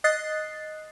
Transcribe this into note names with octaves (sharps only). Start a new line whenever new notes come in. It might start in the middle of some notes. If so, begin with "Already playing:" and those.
D#5 D#6 F#6 A6 C7